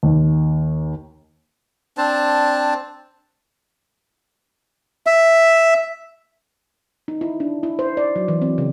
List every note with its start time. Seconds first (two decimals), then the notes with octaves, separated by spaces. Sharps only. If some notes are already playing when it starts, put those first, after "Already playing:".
0.03 D#2
1.98 C4 D4 C5 A5
5.06 E5
7.08 D#4
7.21 E4
7.40 D4
7.63 E4
7.79 C5
7.97 D5
8.16 F#3
8.28 E3
8.42 C4
8.58 C#3